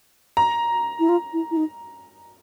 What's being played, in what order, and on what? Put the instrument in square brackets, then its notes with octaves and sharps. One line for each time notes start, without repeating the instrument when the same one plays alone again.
[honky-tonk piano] A#5
[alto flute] E4
F4
E4
E4
D#4